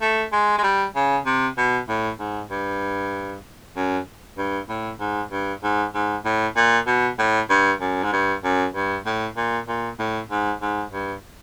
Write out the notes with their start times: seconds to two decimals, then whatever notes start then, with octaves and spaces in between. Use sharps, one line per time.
0.01 A3
0.33 G#3
0.58 G#3
0.63 G3
0.95 C#3
1.26 C3
1.57 B2
1.89 A2
2.19 G#2
2.51 G2
3.76 F#2
4.37 G2
4.69 A2
5.00 G#2
5.31 G2
5.63 G#2
5.95 G#2
6.25 A2
6.57 A#2
6.87 B2
7.19 A2
7.50 G2
7.81 F#2
8.04 G#2
8.12 G2
8.44 F#2
8.75 G2
9.06 A2
9.37 A#2
9.68 A#2
9.99 A2
10.31 G#2
10.62 G#2
10.93 G2